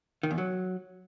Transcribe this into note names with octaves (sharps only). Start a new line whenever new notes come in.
D#3
E2
F#3